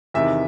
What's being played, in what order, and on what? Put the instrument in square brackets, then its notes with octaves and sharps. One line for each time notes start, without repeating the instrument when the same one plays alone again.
[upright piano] E2 C3 D#3 E5